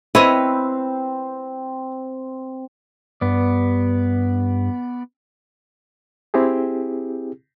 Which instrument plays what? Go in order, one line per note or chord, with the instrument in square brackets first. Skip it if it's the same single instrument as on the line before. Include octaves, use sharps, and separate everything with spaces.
[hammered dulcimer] C4 [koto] E4 C#5 D#5 [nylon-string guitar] B4
[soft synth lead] G2 [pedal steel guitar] B3 D5
[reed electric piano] C4 E4 G4 G#4